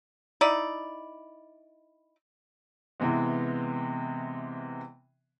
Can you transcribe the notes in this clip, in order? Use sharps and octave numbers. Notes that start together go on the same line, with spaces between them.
D#4 E4 D5
C3 E3 G#3 B3